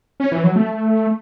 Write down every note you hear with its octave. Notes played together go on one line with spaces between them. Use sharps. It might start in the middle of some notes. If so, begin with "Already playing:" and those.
C#4
E3
F#3
A3